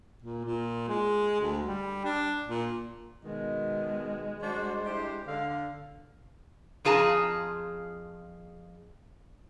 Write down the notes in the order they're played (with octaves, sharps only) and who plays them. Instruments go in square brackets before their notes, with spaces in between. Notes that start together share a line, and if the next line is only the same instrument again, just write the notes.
[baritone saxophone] A#2
A#2
G#3
D2
G3
D4
A#2
[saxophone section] B2 D#3 [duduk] G#3
[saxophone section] F#3 D4 F#4 [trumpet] C5
[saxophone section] D4 E4 G4 [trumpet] C5
[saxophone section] D3 [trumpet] F5
[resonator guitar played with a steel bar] F2 F4 G#4 A5 A#5